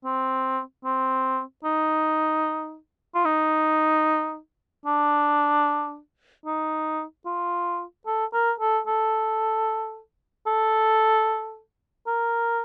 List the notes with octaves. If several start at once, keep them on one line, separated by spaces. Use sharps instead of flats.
C4
C4
D#4
F4
D#4
D4
D#4
F4
A4
A#4
A4
A4
A4
A#4